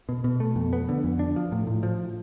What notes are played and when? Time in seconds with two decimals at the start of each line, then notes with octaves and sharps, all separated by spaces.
0.09 B2
0.24 B2
0.40 A3
0.56 F2
0.73 B3
0.89 D3
1.04 F2
1.19 D4
1.36 F3
1.52 A2
1.67 A2
1.83 F3